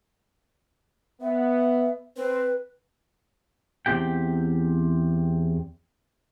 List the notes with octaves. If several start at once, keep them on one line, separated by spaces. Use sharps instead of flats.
B3 E5
C4 B4
E2 C4 G4 G5